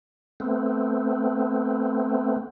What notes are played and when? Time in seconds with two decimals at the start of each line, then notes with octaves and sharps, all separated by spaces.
0.40 A3 B3 C4